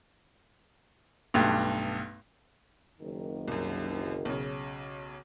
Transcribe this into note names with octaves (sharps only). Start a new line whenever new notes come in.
B1 G2 A3
F#1 D#3
C2 F#2
B1 C#3